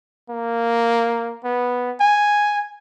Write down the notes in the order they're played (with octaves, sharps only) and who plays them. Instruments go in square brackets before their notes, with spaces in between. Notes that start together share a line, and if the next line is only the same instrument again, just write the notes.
[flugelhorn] A#3
B3
G#5